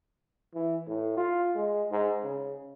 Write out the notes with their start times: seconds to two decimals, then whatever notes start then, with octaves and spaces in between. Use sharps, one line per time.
0.55 E3
0.87 A2
1.17 F4
1.55 G#3
1.91 G#2
2.23 C#3